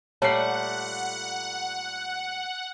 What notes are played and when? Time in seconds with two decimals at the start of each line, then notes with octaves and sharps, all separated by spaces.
0.22 A#2 G3 A3 C#5 F#5 A5 C7